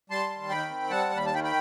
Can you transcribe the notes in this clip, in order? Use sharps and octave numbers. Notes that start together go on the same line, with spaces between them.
G3 A5 C6
D#2
D#3 G5 B5
C4
G3 F#5 A5
D#2
B5
A5
D#3 G5 B5
G5 B5